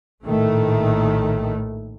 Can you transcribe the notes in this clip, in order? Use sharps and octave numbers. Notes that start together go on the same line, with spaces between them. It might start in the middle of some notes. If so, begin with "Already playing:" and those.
A#1 A2 D#3 A3